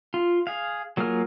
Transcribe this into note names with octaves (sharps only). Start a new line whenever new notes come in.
F4
G#4 F5
F#3 A#3 F4 G#4 F6